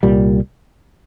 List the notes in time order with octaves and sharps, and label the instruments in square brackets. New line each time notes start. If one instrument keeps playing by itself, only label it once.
[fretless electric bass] C2 A#2 G3